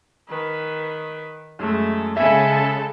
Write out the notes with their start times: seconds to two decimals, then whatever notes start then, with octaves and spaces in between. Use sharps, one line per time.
0.29 D#3 B4
1.59 F#2 G#3 A3
2.17 C#3 G#3 A4 E5 G#5 B5